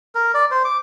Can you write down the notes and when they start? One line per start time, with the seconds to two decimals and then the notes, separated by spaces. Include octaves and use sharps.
0.15 A#4
0.34 D5
0.51 C5
0.65 D6